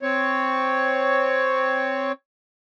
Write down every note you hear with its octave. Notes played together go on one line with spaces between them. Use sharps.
C4 C#5